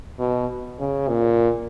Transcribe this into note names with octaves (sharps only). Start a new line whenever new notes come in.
B2
C#3
A#2